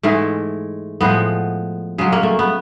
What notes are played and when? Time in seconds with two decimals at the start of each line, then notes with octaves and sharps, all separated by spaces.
0.03 G#2 E3 G#3 A3
1.01 A2 F3 G#3 B3
1.98 C#3 F#3 G#3
2.12 A#3
2.23 A3
2.39 B3